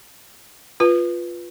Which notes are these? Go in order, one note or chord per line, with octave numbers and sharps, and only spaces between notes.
F4 B4